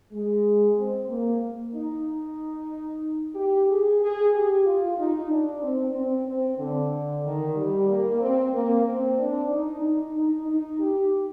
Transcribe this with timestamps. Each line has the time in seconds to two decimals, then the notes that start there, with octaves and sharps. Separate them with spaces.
0.12 G#3
0.77 C4
1.08 A#3
1.74 D#4
3.35 G4
3.68 G#4
4.01 G#4
4.33 G4
4.65 F4
4.98 D#4
5.30 D4
5.62 C4
5.95 C4
6.26 C4
6.59 D3
7.23 D#3
7.56 G3
7.88 A#3
8.21 C4
8.53 A#3
8.85 C4
9.18 D4
9.51 D#4
9.82 D#4
10.15 D#4
10.47 D#4
10.79 G4